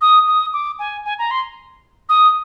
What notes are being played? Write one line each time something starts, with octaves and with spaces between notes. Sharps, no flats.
D#6
D#6
D6
G#5
G#5
A#5
C6
D#6